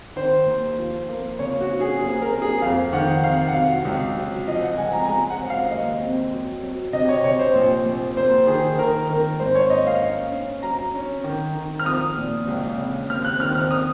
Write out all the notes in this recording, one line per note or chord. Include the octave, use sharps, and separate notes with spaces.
D#3 C5
D#2
F3
A#3
C#3 C#5
F#4
C#4
G#4
F#1 G#4
A#4
F#1
G#4
F2 F5
D#3 F#5
C3 F5
F#5
F#3 F5
C#2
F#3
F3 D#5
F#5
C#2 G#5
A#5
G#5
G#3 A#5
F#5
F#2
F5
D#2 D#5
C4
F#3
F#3
C3 D#5
C#5
C3 C#5
C5
A#1
A#1
F#1 C5
D#3 G#4
D#3 A#4
D#3 A#4
G#2 C5
C#5
A#3 D#5
F5
C#4
C#4
F#3 A#5
C#4
D#3
D#3
F6
F3 D#6
A#2
C#2
C#3
D#2 F6
F#6
D#3 F6
F6
D#6